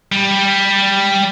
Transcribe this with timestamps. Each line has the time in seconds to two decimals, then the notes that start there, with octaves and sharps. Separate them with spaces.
0.12 G3